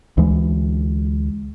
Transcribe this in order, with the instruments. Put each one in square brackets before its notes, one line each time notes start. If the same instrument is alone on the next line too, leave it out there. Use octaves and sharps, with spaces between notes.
[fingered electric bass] D2 E3 G#3